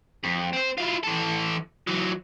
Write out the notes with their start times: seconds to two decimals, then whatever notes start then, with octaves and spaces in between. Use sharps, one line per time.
0.24 F2
0.53 C4 C5
0.78 E4 F4
1.04 E3 A4
1.87 E3 F#3